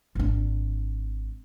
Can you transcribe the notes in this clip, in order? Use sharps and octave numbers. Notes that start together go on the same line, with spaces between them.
G#1 D4